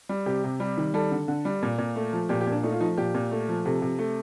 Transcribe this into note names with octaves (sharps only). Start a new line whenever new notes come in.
G3
C3 G4
C3
G3
D#3
G3 A4
D3
D3
G3
A#2
A#2
A3
F3
A#2 G4
G4
A#2
D4
A3 D#4
F4
F3 D#4
A#2 G4
A#2
A3
F3
C3 A4
C3
A3